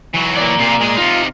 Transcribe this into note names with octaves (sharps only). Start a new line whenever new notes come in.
E3 F#3
A#3 D5
C3 F4
G#3 G#4
C3 D#4 F4